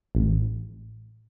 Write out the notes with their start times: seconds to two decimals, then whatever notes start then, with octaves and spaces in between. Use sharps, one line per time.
0.15 A1